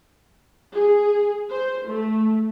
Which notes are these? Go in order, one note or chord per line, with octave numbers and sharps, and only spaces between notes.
G#4
C5
A3